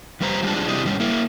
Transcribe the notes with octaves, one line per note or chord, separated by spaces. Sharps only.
F2 G3 B4 C5 A#5
F3 G3 G#3 D4
C3 E4 G4 D5 D#5
G#2 G3 C#4
A#3 E4